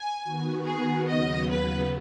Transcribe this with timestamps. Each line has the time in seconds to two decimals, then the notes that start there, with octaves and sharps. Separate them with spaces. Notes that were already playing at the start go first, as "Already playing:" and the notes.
Already playing: G#5
0.24 D#3 B3 F#4
0.66 G#4
1.08 D#2 C#3 F#3 B3 D#5
1.51 B4